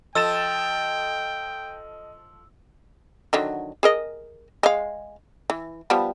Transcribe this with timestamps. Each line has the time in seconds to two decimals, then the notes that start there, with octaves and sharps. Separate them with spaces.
0.15 F3 F4 A4 D#5 G5 E6 A6 E7
3.33 D3 D#3 F#3
3.83 G#4 A#4 D#5
4.63 G#3 F5
5.50 E3
5.90 F3 G3 B3